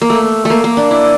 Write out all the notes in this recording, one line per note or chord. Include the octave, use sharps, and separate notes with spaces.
A#3
A3
A3 A#3
A#3
D4
E4